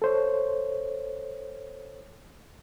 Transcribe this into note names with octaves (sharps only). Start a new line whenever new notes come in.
A4 C5 C#5